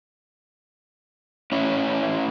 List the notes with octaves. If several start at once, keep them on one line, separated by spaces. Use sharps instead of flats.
A2 C#4 E4